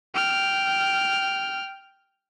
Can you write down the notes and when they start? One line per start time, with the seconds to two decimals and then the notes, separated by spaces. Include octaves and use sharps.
0.14 G5 F6